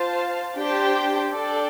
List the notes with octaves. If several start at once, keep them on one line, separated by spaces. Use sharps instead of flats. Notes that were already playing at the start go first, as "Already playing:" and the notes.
Already playing: F4 C5 F5 A5
D4 G4 C5 G5
D4 A4 D5 G5